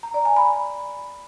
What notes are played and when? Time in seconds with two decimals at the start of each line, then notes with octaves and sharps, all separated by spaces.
0.03 A#5
0.14 D5
0.25 G#5
0.36 B5